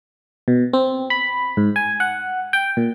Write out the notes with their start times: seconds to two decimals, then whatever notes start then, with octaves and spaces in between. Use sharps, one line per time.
0.48 B2
0.73 C4
1.10 B5
1.57 G#2
1.76 G#5
2.00 F#5
2.53 G5
2.77 A#2